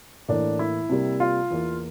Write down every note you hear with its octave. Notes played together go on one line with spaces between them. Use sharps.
A2 E3 A#3 D4
E4
C3 G3 A#3
F4
E2 E3 A#3